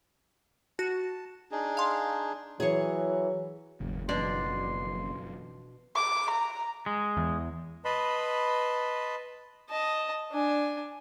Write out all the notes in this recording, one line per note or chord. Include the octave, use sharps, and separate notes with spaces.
F#4 A5
D4 D#4 G#4
F5 C6
E3 F#3 G#4 C#5
F#1 D#2 G#2 C#3
F#2 B2 E3 F3 D4 D5 C6
D6
A#5
G#3
E2
B4 D#5 A5 B5 C6
D#5 A5
D4 G#5